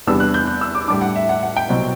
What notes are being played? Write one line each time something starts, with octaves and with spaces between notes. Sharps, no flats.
E2 C3 G3 B3 D4 E6
F#6
G6
F#6
E6
D6
A2 G3 D4 D6
F#5
E5
F#5
F#5
G5
C2 B2 F#3 C4